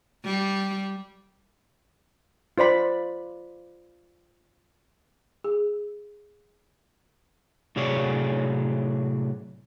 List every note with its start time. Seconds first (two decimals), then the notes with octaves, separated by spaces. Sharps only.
0.25 G3
2.58 F4 C5 D5 B5
5.44 G#4
7.76 A2 C3 F#3 G#4 C#5 D5